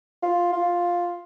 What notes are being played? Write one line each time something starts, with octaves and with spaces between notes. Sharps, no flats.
F4
F4